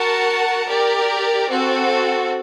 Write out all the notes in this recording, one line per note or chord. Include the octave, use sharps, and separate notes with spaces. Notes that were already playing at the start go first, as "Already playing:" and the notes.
Already playing: F#4 A#4 F#5 A5
G4 A#4 D5
C4 F#4 A4